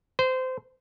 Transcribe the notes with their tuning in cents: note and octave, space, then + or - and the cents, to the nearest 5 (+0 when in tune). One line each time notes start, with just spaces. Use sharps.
C5 -25